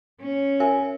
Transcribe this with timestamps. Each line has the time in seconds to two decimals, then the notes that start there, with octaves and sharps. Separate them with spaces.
0.21 C#4
0.60 A#4 E5 G#5